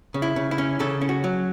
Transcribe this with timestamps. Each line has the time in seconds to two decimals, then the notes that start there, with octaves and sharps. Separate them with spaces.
0.14 C#3
0.22 E4
0.36 C#3
0.51 E4
0.58 C#4
0.80 C#3 A4
1.01 C#4
1.09 F#4
1.24 F#3